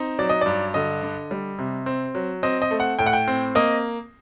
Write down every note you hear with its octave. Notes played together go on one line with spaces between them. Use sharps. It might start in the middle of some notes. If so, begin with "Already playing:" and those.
Already playing: C4 D#4
F#3 D5
D#5
G2 D5
D3 D#5
D3
G3
C3
C4
F#3
C4 D#5
D#5
A3
F#5
A2 G5
F#5
G5
C4
A#3 D#5